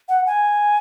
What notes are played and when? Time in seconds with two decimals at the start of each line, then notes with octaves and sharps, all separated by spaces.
0.09 F#5
0.26 G#5